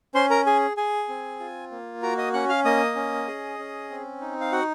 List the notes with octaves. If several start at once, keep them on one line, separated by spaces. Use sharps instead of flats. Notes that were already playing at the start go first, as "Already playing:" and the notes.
C#4 C5 C6
A#4 A#5
G#4 G#5
G#4 G#5
C4
F4
A#3
F#4 A#4 A#5
D#5 D#6
C#4 F#5 F#6
F5 F6
A#3 D#5 D#6
C#4
G#4
C#4
C4
D#4
F5
F#4 F#5